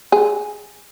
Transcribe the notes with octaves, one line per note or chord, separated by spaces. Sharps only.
G#4